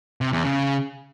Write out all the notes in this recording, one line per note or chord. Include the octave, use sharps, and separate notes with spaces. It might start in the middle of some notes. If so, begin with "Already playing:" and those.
C3
E2
C#3